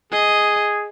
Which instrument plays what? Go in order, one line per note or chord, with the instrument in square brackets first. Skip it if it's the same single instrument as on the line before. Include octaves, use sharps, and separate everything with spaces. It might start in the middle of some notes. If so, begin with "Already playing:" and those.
[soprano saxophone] G#4 [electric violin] D#5